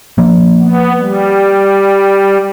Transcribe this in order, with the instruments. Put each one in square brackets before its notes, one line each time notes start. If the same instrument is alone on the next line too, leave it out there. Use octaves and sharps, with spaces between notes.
[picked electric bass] F3 A#3
[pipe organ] B3
G3